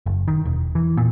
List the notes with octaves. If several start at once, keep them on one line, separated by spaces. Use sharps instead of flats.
F#1
D#3
E1
E3
A#2